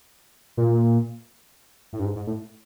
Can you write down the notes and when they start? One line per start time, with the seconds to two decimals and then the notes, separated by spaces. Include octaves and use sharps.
0.57 A#2
1.93 A2
2.00 G2
2.05 G#2
2.16 G#2
2.27 A2